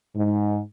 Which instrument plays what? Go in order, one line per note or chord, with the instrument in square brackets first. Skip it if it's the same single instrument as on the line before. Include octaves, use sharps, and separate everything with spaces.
[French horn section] G#2